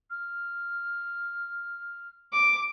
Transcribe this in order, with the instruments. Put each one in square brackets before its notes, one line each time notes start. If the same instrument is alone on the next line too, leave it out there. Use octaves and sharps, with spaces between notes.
[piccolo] F6
[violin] D6